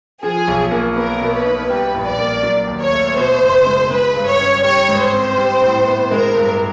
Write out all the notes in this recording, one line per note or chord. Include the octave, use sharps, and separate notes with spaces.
F3 G#4
B1
A#3
B3 A#4
B2
B4
D#4
G3 B4
A#1
D5
A#3
F#3
D#2
C#5
A3
B2 C5
F#1
G#3
G#3 B4
G2
C#5
C#4
G3 C#5
G#2
C5
C4
G3
A2
B3
G#3 A#4
G2